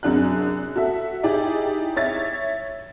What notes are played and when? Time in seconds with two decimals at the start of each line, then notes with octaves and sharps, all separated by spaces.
0.03 F#2 C3 D4 G#4 F#6
0.76 F#4 A4 E5
1.23 D#4 E4 G4 G#4 D5
1.96 C#5 E5 A6